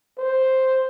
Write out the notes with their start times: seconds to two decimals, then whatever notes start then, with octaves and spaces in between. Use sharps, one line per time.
0.18 C5